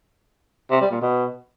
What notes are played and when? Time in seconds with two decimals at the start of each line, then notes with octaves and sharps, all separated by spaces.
0.71 C3
0.81 G3
0.91 A#2
1.02 B2